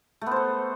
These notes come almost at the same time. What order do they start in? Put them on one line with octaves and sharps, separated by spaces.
A3 B3 C5 A4